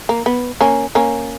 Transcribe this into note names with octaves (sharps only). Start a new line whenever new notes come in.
A#3
B3
A#3 C#4
A#3 C#4